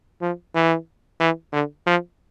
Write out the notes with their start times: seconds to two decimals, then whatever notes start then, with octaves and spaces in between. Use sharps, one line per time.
0.21 F3
0.55 E3
1.20 E3
1.53 D3
1.87 F3